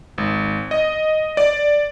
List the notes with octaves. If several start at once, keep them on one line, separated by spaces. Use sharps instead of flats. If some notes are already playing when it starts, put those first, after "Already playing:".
G#1
D#5
D5